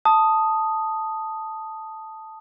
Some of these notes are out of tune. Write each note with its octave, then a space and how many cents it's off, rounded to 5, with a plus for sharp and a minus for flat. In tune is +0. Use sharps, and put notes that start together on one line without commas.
A5 +0 D#6 +0